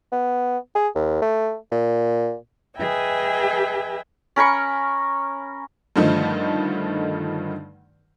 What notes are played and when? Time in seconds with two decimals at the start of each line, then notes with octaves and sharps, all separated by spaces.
0.12 B3
0.75 G#4
0.95 D#2
1.22 A3
1.72 A#2
2.77 G#4 B4 D#5 E5 G5 G#5
4.36 C#4 A#4 B5 C#6
5.96 G2 D3 D#3 F3 A3 D#4